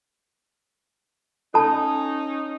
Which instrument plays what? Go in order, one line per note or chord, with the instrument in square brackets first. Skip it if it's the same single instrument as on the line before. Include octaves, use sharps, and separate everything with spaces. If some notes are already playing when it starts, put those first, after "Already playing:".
[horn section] C#4 D#4 [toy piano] A4 A5